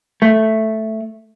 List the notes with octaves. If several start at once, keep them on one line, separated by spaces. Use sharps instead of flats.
A3